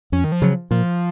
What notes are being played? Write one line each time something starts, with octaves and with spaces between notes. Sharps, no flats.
F2 C#4
D#3
F3
C#3 F#3
A#2 F3